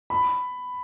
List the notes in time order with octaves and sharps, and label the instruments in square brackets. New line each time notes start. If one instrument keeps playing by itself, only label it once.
[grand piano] B5